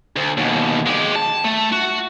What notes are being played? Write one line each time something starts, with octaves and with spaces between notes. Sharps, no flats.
D2
D#2 B2
G#3 G4
A5
A3
F#4